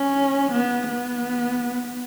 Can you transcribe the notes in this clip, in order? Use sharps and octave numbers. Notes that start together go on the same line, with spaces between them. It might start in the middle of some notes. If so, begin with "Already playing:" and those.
Already playing: C#4
B3
B3